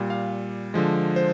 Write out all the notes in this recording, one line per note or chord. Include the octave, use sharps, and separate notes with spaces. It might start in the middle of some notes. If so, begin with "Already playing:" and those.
Already playing: A#2 G3
F5
D3 F3 G#3
C5